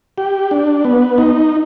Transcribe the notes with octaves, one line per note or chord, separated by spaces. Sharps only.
G4
D4
B3
D#4